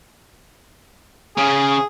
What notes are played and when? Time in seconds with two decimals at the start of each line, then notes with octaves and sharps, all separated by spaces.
1.37 C#3 G#4